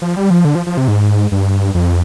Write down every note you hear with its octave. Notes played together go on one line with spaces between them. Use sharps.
F3
G3
F3
D3
F3
F3
C3
G#2
G2
F2